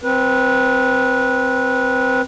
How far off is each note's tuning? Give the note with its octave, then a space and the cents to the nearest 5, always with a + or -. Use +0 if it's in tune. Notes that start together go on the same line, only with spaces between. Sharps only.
C4 +0 B4 -20